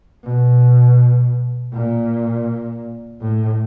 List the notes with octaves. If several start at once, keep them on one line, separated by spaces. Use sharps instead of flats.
B2
A#2
A2